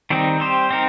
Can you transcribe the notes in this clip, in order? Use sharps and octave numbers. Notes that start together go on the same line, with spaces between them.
D#3 G3 C4 D#4
G3 C4 G4 C5
C4 D#4 A#4